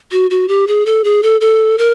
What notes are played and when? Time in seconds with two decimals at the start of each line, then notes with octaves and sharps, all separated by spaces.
0.12 F#4
0.30 F#4
0.48 G4
0.67 G#4
0.86 A4
1.04 G#4
1.23 A4
1.41 A4
1.78 A#4